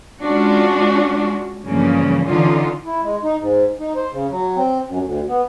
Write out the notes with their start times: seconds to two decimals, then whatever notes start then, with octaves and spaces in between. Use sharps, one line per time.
0.22 G#3 C#4 D4 F4 F#4
1.65 E2 G2 C#3 F3 A#3
2.27 D3 E3 C#4 D#4 F4
2.85 E4
3.03 G#3
3.24 D#4
3.40 G#2
3.80 D#4
3.95 C5
4.12 C#3
4.30 F#3
4.56 C4
4.87 F#2
5.02 D2
5.28 B3